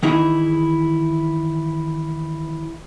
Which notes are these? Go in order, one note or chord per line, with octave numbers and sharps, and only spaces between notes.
D#3 E3 D#4 E4 G#4